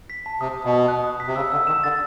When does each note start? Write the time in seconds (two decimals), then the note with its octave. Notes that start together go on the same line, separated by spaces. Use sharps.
0.10 B6
0.26 A5
0.41 C3 D#6
0.57 D#6
0.65 B2
0.73 D#6
0.88 F#6
1.04 D#6
1.20 B6
1.28 C3
1.36 C#3 E6
1.52 D3 E6
1.67 D#3 E7
1.83 D3 A6